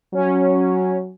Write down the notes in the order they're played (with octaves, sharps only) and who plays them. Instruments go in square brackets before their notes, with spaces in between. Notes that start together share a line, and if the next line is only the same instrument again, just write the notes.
[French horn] F#3 [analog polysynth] C#4